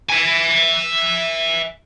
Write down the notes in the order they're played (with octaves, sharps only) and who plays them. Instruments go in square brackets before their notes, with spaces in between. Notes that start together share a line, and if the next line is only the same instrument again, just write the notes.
[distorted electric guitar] E5 G#5